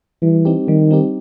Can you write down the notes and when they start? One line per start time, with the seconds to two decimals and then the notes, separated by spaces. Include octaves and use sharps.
0.22 E3 G3
0.45 C4 D#4 G4
0.68 D#3 G3
0.91 C4 D#4 G4